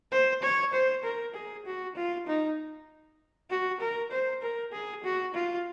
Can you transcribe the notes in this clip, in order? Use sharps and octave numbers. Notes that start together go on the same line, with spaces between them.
C5
C#5
C5
A#4
G#4
F#4
F4
D#4
F#4
A#4
C5
A#4
G#4
F#4
F4